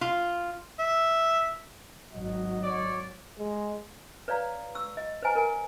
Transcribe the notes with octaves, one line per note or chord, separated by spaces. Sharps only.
F4
E5
G#1 F#3 D#5
C#5 D5
G#3
B4 C#5 D5 F5 A#5
C#6 E6
D#5
B4 C5 D#5 G#5 A#5
A#4 G#5